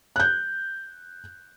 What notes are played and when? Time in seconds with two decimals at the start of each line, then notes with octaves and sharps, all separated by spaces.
0.16 F#6 G6